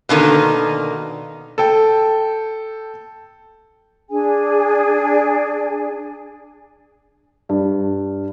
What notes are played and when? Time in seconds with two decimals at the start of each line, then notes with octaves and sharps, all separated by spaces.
0.09 B2 D3 D#3 A#3
1.58 A4 G5
4.10 D4 G#4 G#5
7.49 G2